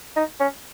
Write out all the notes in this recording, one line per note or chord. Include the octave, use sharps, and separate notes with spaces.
D#4
C#4